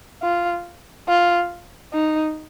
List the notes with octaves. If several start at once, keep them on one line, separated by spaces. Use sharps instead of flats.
F4
F4
D#4